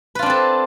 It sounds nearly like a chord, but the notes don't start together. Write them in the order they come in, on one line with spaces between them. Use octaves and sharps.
B4 F4 D4 C4 A4